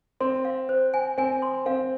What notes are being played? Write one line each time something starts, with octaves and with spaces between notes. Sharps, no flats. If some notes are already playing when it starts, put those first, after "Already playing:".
C4 C6
F5
C5
G#5
C4 G#5
C6
C4 F5